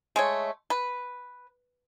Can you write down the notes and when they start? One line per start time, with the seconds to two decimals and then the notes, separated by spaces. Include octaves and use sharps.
0.16 G#3 A3 C#5
0.70 B4